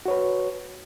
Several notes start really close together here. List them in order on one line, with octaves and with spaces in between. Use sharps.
F#4 C#5 B4